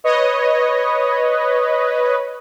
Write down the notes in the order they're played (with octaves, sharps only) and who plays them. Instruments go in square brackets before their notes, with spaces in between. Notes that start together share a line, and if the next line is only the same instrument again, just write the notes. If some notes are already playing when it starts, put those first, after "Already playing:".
[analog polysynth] B4 C#5 D#5